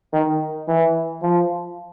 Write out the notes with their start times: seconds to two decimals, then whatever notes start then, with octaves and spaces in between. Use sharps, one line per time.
0.13 D#3
0.68 E3
1.22 F3